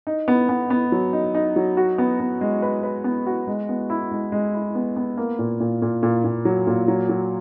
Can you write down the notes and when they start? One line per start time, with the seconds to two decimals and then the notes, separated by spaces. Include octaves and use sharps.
0.07 D#4
0.28 B3
0.49 B3
0.70 B3
0.92 F#3
1.13 D#4
1.34 D#4
1.56 F#3
1.77 F#4
1.98 B3
2.20 B3
2.41 G#3
2.62 B4
2.83 B4
3.04 B3
3.27 F#4
3.47 G#3
3.69 B3
3.90 E4
4.11 G#3
4.32 G#3
4.54 E4
4.75 B3
4.96 B3
5.17 A#3
5.39 A#2
5.60 A#2
5.82 A#2
6.03 A#2
6.24 A#2
6.45 F#3
6.67 A#2
6.88 F#3
7.09 F#3